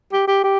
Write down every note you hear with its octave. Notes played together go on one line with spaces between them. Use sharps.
G4
G4
G4